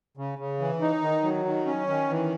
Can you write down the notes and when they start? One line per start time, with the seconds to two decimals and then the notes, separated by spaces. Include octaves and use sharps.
0.17 C#3
0.39 C#3
0.59 E3
0.81 D#4
1.02 D#3
1.23 F#3
1.45 D#3
1.66 C#4
1.87 D#3
2.09 E3